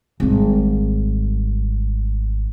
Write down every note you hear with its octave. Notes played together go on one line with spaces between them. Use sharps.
G#1 G3